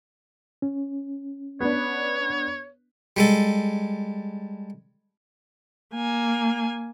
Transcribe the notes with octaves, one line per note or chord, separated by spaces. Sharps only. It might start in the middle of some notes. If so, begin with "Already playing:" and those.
C#4
B3 D4 C#5
G3 G#3 A4
A#3 G#5